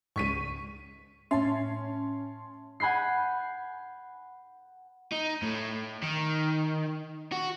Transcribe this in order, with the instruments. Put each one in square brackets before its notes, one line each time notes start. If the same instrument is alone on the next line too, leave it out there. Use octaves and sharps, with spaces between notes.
[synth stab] C#2 G#2 [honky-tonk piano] C#6 B6 D#7
[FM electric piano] A2 A5 C6 [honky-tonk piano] C#4 [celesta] E5
[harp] F#5 G#5 B5 G6 C7
[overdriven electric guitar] D#4
A2
D#3
F#4